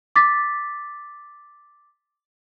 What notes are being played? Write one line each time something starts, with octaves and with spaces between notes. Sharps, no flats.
D6 A6 B6